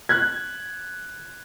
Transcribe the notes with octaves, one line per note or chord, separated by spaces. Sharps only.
F#6 G#6